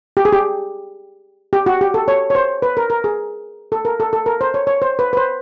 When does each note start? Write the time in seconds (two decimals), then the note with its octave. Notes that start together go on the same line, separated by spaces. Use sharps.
0.17 G4
0.25 G#4
0.33 G4
1.53 G4
1.66 F#4
1.81 G4
1.94 A4
2.08 C#5
2.30 C#5
2.35 C5
2.62 B4
2.77 A#4
2.90 A#4
3.04 G#4
3.72 A4
3.85 A#4
4.00 A4
4.13 A4
4.26 A#4
4.41 C5
4.54 C#5
4.67 C#5
4.82 C5
4.99 B4
5.13 B4
5.17 C5